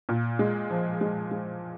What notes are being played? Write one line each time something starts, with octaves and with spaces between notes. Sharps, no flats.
A#2
G#3
F3
G#3
G#3